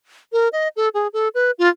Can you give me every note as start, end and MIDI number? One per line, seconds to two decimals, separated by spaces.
0.33 0.48 70
0.53 0.68 75
0.76 0.89 69
0.94 1.08 68
1.13 1.28 69
1.35 1.51 71
1.59 1.69 65